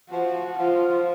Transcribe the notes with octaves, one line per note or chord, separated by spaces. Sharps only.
F3 F#4
F3 F4